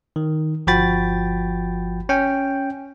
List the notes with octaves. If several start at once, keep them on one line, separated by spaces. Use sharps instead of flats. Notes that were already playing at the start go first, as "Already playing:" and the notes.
D#3
G1 F3 F#4 G5 B5 A6
C#4 G5